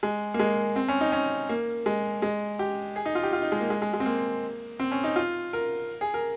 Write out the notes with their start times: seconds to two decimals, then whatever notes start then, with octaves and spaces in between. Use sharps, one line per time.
0.03 G#3
0.34 A#3
0.39 G#3
0.76 C4
0.88 C#4
1.01 D#4
1.12 C#4
1.49 A#3
1.86 G#3
2.22 G#3
2.59 G4
2.96 G#4
3.06 D#4
3.15 F4
3.23 G4
3.33 F4
3.42 D#4
3.52 G#3
3.60 A#3
3.70 G#3
3.82 G#3
3.94 G#3
4.00 C4
4.06 A#3
4.80 C4
4.92 C#4
5.04 D#4
5.16 F4
5.53 A#4
6.01 G#4
6.14 A#4